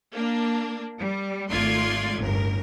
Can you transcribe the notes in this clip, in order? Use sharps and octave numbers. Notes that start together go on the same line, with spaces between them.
A#3 D4
G3
G#1 A3 F4 D5 C6 G#6
G1 C#2 A2 A#4